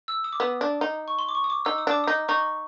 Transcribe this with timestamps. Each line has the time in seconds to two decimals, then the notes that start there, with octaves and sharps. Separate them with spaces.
0.08 E6
0.24 D#6
0.33 D6
0.40 B3 D#6
0.61 D4
0.81 D#4
1.08 C#6
1.19 C6
1.29 D6
1.35 C#6
1.44 D#6
1.50 D6
1.65 D#4 E6
1.78 D#6
1.87 D4 D6
2.04 D#4 D#6
2.28 D#4 C#6